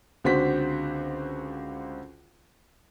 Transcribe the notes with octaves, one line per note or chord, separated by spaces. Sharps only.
C#2 D3 C4 F#4 C5 B6